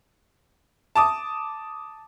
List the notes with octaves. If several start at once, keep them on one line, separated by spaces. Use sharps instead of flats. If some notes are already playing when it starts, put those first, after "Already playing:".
A5 D6 D#6